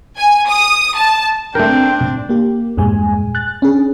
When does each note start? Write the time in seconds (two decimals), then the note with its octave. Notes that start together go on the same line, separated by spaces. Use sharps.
0.18 G#5
0.49 D#6
0.97 A5
1.55 A3 C4 D4 A#4 G5
2.29 A#3 G4
2.77 E2 G2 A#2 G#3 G#5
3.35 F#6 A6
3.62 C#4 D4 G#4